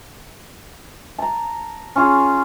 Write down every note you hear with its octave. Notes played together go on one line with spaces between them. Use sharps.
A5 A#5
C#4 F4 G#4